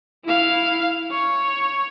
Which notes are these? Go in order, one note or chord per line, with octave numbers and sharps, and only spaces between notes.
E4 F5
C#5